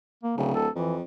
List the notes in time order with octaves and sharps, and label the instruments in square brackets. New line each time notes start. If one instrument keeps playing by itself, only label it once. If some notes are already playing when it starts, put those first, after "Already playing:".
[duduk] A#3
[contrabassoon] D1 [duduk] C#3
[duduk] A4
[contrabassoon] F2 [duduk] E3